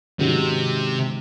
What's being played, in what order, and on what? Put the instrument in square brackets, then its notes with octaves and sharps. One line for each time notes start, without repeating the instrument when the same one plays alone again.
[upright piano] G#2 D#3 G#3 C#4 F#4 [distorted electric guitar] C3